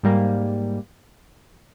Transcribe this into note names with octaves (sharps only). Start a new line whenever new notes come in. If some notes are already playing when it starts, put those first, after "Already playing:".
G#2 G3 A#3